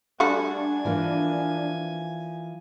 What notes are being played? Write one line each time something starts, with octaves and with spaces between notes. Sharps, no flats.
G3 A3 D4 F#4 G#5
E3 F3 A#3